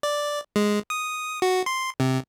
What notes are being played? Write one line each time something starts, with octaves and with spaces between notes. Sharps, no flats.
D5
G#3
D#6
F#4
C6
C3